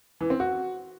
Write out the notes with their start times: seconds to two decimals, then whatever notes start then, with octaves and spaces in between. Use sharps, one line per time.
0.21 E3
0.30 C4
0.40 F#4